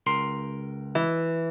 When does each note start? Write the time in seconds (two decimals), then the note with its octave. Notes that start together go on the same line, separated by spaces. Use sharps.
0.07 C#2 A#4 C6
0.95 E3